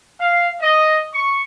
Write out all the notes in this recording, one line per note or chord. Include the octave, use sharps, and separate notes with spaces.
F5
D#5
C#6